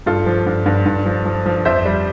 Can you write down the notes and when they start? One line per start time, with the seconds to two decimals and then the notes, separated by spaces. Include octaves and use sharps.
0.06 G2 F4 A4
0.26 F3
0.46 G2
0.66 G2
0.86 G2
1.06 F3
1.25 F3
1.46 F3
1.65 F2 C5 E5
1.85 G3